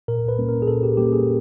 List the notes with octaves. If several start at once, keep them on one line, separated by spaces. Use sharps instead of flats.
A#2 A#4
B4
G3 A#3 C#4
A#4
G#4
A#2 A4
G4
G3 A#3 C#4 G4
G#4